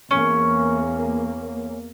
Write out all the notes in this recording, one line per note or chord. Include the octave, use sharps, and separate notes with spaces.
E2 A#3 C#4